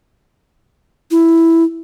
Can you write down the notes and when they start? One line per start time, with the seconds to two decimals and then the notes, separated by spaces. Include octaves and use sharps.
1.11 E4